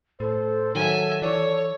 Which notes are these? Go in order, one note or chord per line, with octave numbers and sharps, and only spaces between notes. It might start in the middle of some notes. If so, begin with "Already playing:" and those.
A2 A4 C5
D#3 F#3 E5 G#5
E3 C#5 D5